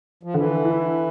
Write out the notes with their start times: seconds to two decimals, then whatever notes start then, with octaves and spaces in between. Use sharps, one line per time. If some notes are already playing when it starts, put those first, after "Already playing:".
0.23 F3
0.34 D3 E3
0.65 E4